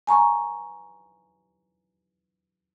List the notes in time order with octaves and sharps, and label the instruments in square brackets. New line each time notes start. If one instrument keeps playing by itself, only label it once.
[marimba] G#5 A#5 C#6